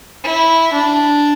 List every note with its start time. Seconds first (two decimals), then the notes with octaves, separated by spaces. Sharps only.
0.24 E4
0.73 D4